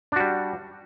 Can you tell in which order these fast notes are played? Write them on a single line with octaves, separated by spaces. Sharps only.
D4 F#4 G3